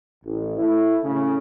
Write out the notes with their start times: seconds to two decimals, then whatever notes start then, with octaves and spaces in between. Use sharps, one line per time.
0.24 A1
0.57 A3 E4
1.04 A2 C#3